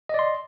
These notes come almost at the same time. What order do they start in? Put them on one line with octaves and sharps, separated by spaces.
D#5 D5 C6